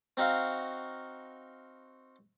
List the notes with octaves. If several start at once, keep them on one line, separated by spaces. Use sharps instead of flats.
C4 D#4 F#4 F5 A#5